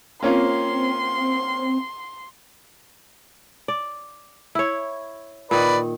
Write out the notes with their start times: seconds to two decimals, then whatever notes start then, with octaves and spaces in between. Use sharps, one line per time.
0.23 A#3 C4 C#4 F4 C6
3.68 D5
4.55 E4 C#5
5.51 A#2 D#3 B4 D5